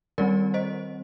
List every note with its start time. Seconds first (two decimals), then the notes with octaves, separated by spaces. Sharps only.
0.18 D#3 G3 C4 A#4 D5
0.54 C5 D#5